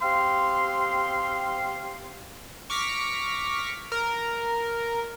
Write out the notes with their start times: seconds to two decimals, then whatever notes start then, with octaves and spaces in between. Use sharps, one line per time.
0.02 C4 G4 F5 C6
2.70 C#6 D6 F6 A#6 B6
3.92 A#4